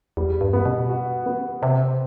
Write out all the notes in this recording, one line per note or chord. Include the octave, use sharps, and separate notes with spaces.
E2 G3
G2
B3
B2
F#4
B3
C3 C4